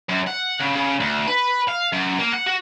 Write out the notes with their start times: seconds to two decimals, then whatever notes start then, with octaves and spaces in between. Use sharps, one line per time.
0.09 F#2
0.27 F#5
0.60 C#3
0.75 C#3
1.00 D2
1.28 B4
1.68 F5
1.93 F#2
2.19 A#3
2.33 F#5
2.46 F#4